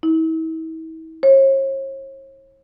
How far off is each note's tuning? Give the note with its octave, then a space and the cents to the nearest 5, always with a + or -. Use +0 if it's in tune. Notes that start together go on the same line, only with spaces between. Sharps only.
E4 -40
C#5 -45